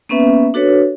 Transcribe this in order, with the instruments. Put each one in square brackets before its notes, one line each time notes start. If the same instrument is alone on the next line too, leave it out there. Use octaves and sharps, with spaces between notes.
[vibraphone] A#3 B3 C#4 B4 E5
D4 F#4 A4 B4 C#5